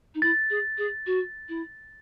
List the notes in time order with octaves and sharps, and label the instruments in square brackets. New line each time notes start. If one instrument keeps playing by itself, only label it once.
[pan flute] D#4
[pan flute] E4 [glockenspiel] A6
[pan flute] G#4
G#4
F#4
E4